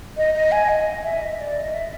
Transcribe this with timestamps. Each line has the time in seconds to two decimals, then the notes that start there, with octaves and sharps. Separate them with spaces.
0.17 D#5
0.34 D#5
0.52 G#5
0.69 D#5
1.04 E5
1.21 D#5
1.39 D5
1.56 D#5
1.74 E5